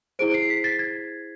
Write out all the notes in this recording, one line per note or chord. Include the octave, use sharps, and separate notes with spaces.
E4 G#4 C5 D7
C7
B6
A6
G#6